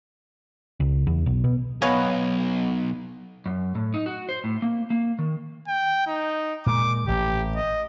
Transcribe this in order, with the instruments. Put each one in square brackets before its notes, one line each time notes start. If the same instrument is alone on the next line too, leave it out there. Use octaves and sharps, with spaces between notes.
[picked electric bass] C#2
E2
B1
B2
[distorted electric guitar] B1 [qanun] B3 D#5 [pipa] C#5 F5 G#5
[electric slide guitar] F#2
A2
D#4
F#4
C5
A2
A#3
A#3
D#3
[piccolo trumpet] G5
D#4
[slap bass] A#2 G#3 [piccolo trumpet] D6
[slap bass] A1 [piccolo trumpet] G4
[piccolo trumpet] D#5